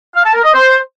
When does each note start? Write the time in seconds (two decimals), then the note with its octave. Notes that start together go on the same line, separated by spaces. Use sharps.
0.14 F5
0.24 A5
0.34 A#4
0.44 D#5
0.54 C5